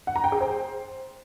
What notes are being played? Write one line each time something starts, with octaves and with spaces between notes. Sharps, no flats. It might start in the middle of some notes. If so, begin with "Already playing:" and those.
F#5
A#5
G5
G#4
C5